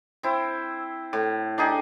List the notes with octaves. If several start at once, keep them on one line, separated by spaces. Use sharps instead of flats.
C4 E4
A2
D4 D#4 G4 G#4